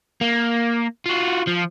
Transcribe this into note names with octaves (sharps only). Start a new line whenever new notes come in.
A#3
F4 F#4
F3